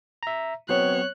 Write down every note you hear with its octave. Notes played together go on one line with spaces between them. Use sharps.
E5 A#5
F#3 B3 C4 C#5 F#6